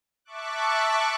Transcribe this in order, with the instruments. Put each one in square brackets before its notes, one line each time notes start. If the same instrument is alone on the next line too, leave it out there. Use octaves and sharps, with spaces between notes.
[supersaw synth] E5 A5 C#6 D6 F#6